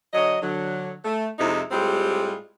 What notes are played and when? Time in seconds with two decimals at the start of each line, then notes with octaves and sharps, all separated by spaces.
0.14 D3 F#3 C#5 D#5
0.42 D3 F#3
1.05 A3
1.39 F2 C3 G#3 D#4 E4
1.70 A2 G3 G#3 C4 F4 G4